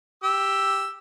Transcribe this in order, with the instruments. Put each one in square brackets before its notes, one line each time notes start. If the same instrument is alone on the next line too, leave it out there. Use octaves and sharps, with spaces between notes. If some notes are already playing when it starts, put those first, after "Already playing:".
[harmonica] G4 E6